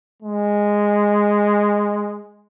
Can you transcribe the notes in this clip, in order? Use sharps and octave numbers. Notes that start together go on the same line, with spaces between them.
G#3